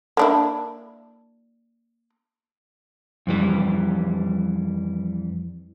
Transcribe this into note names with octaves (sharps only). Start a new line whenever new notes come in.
A#3 D4 E4
F2 E3 G3